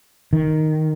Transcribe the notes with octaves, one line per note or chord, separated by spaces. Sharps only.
D#3